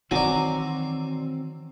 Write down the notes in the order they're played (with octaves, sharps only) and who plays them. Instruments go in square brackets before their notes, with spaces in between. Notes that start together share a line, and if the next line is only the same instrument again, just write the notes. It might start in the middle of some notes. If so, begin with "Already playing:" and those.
[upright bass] D#3 E3 [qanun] F#3 A#5 D6 [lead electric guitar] C4 [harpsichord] D5 G#5